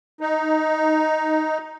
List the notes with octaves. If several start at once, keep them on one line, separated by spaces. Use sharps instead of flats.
D#4